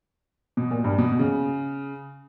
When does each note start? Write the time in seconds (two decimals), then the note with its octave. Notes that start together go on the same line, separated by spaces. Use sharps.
0.57 B2
0.71 A#2
0.84 G2
0.98 B2
1.12 B2
1.19 C#3